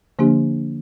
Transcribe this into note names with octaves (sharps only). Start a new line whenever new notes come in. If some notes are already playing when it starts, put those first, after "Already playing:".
D3 F3 A#3 D4 G4